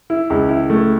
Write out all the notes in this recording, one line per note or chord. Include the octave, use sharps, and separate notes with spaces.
E4
C#2
E4
A3